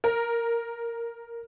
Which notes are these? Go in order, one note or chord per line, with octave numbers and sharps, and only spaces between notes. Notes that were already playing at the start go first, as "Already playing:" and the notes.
A#4